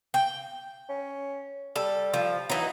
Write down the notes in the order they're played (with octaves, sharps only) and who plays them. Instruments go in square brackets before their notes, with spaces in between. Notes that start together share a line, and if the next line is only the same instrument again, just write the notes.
[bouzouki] G5
[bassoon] C#4
[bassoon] G3 [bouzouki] A4
[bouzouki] F3
[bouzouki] E3 D#4 [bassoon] F#3